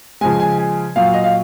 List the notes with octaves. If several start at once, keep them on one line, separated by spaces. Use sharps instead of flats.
C#3 F3 G#3 G#5
G#5
G#5
A#2 F#3 F5
D#5
F5